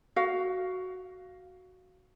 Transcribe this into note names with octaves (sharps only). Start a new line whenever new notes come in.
F#4 F5